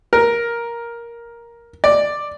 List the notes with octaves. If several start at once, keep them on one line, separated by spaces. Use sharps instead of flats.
A#4
D5